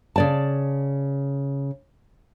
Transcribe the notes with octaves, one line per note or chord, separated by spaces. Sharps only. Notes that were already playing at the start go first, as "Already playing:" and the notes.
C#3 D5 A5